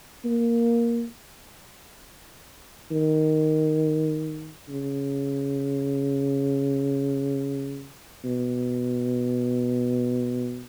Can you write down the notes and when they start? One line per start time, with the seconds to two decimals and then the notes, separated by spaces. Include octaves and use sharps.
0.25 A#3
2.91 D#3
4.69 C#3
8.24 B2